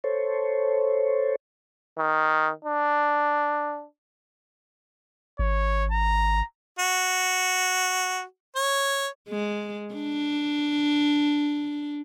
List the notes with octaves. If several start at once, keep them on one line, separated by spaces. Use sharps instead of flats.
A4 C5 C#5
D#3
D4
G#1 C#5
A#5
F#4
C#5
G#3
D4